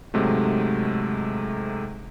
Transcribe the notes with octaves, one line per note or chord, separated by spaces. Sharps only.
G#2 C3 F#3 G#3 A3